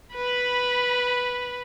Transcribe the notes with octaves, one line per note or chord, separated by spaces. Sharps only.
B4 B5